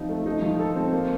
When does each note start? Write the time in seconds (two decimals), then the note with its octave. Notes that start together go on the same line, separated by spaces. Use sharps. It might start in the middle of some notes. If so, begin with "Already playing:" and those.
Already playing: F3 C4 D#4
0.09 A3
0.26 D#4
0.42 F3
0.59 A4
0.76 C4
0.93 A#3